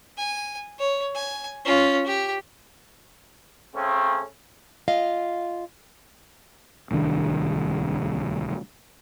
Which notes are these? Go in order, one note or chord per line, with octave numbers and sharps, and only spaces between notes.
G#5
C#5
G#5
C#4 F4
G4
C#3 A3 C4 C#4
F4 D#5 F5
D1 C2 D#3 D4